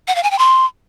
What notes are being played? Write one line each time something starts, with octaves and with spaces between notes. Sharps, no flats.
F#5
F5
G#5
G5
C6